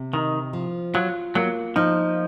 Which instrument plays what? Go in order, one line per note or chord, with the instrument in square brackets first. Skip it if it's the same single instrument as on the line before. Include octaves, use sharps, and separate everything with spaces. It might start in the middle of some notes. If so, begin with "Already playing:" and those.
Already playing: [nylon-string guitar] C3
[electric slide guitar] D#3 [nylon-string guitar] D#4
[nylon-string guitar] F3
[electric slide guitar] F#3 [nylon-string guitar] F4
[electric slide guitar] F#3 [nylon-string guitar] A#3
[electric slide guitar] F3 [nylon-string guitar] D#4